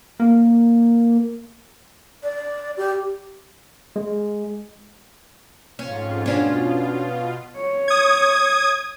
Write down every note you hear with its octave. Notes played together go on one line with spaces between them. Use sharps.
A#3
D5
G4
G#3
F2 G#2 C#4 F4
B2 C#4 D4 F4
C#5
D#6 G#6